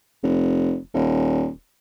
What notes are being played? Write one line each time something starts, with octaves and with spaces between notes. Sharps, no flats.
F1
D#1